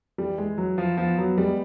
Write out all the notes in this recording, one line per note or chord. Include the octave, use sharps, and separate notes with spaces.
E3 G3
G#3 E4
E3 F#3
F3 E4
F3 B3
F#3 B3
G3 G#3